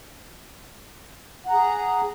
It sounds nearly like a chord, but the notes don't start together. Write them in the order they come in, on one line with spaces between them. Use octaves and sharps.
F#5 A#5 G#4